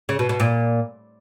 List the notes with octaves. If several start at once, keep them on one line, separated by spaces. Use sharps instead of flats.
C#3
B2
B2
A#2